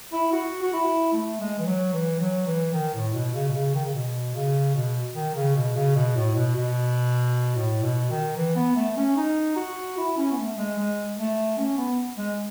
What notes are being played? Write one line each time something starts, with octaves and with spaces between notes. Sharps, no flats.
E4
F#4
F#4
E4
A3
G#3
E3
F#3
E3
F#3
E3
D#3
A2
B2
C#3
B2
C#3
D#3
C#3
B2
C#3
B2
D#3
C#3
B2
C#3
B2
A2
B2
B2
A2
B2
D#3
E3
B3
A3
C#4
D#4
F#4
E4
C#4
B3
A3
G#3
G#3
A3
C#4
B3
G#3